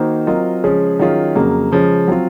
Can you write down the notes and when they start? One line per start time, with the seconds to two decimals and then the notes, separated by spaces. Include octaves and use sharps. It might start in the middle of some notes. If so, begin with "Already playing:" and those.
Already playing: D#3 A#3 D#4 F#4 C5
0.27 F#3 C4 F4 A#4 D#5
0.63 C#3 F3 G#3 C#4 G#4
0.99 D#3 F#3 C#4 F4 G#4
1.35 F2 C#3 F#3 A#3
1.72 C#3 F3 G#3 C#4
2.08 F#3 C4 F4